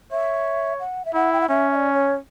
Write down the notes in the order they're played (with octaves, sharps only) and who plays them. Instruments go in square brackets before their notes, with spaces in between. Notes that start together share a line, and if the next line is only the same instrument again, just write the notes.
[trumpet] C#5 [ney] E5
[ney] F#5
E5
[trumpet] E4 [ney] F#5
[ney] G5
F#5
[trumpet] C#4 [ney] E5
[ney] E5
D5
C#5